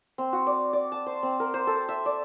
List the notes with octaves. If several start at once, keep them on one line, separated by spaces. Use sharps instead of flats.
C4
F#4
D5
D5
A5
C5
C4
A#4
C5
A4
E5
D5